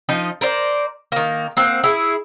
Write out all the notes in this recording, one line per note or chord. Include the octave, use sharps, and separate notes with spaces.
F3 D#4 D#5
A#4 C5 D5
D#3 A#3
A#3 C4 F#5
E4 G#4